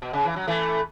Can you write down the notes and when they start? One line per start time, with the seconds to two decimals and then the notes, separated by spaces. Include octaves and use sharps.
0.02 B2
0.13 C#3
0.25 E3
0.36 F#3
0.47 E3 A3